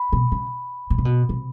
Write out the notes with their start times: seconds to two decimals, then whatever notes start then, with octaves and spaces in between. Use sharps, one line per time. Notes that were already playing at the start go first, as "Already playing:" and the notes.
Already playing: B5
0.13 B2
0.32 C#3
0.90 B2
0.98 C3
1.05 B2
1.29 C3